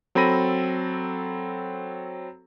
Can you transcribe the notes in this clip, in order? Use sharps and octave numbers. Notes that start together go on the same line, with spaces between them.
F#3 C4 A4 B5 A#6 D#7